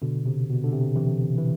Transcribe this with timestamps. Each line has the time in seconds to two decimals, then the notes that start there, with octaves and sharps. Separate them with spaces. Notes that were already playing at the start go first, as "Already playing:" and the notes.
0.02 B2 D3
0.26 C3
0.49 B2
0.64 D3
0.72 C3
0.96 C3 E3
1.38 E3